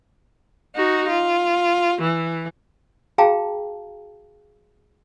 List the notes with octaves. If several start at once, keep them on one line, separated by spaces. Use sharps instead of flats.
D#4 F#4
F4
E3
F#4 G#4 F5 G5 A5 A#5